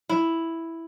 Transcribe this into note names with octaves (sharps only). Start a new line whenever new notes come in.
E4